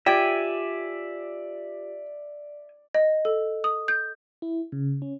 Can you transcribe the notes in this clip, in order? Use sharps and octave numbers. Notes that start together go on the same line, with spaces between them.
F4 G4 D5 E5 G5 G#5
D#5
A4
D#6
G6
E4
C#3
C#4